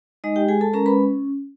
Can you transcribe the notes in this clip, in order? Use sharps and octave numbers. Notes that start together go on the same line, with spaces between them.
G#3 D#4 D#5
G4 G5
G#3 G#4 G#5
A4 A5
C#4 A#4 A#5
B4 B5